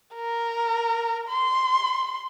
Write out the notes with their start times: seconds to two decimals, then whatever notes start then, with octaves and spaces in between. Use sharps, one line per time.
0.15 A#4
1.29 C6